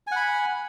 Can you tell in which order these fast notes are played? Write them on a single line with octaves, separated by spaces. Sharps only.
G#5 F#5 B5